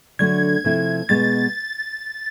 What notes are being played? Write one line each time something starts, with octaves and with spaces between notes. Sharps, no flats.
D3 F#3 A3 D4 F#4 G#6
C3 F3 A3 C4 E4
B2 G#3 B3 A6